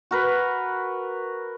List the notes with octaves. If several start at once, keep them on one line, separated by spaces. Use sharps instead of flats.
F#4 A#4 B4